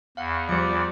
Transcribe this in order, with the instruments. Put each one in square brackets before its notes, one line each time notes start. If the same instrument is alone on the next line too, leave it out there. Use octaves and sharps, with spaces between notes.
[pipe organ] E2 [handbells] F5 F#5
[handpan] F3 G3 [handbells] C5 C#7 [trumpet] D5